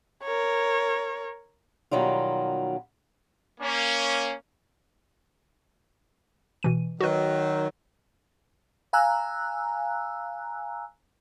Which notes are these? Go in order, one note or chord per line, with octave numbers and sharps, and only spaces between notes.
A#4 C#5
B2 D#3 F#3 G3 F4
A#3 C#4
B2 E3 D#7
D#3 F#3 F#4 B4
F5 G#5 A#5 E6 F#6